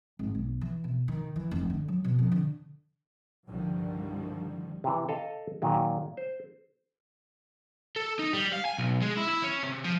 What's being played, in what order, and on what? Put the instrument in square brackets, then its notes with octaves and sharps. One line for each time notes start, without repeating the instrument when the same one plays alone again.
[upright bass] G#1
B1
E3
B2
D#3
E3
F1
D3
F#3
B2
F2
D3
[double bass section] C2 G2 D3 D#3 F3 G3
[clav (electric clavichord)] C3 E3
A4 D#5 F5
A#2 D#3 F#3
C5
[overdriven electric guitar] A4
D#4
G3
F5
G#5
B1
G#3
E4
E4
C#4
C3
F3